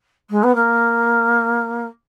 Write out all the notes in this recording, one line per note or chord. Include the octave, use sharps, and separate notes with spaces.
G#3
B3
A#3